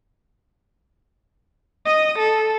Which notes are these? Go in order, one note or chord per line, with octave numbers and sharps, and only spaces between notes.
D#5 D#6
A4